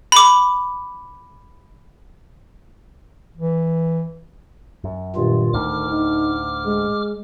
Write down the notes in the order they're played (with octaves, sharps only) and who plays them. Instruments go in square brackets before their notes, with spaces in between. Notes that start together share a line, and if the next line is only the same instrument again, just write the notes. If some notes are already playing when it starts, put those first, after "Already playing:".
[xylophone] B5 D6
[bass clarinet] E3
[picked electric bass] F#2
[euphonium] G2 [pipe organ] A#2 D#3 F4
[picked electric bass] D2 A2 A3 [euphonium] D#3 [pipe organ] D6 F6
[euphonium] D#4
G#3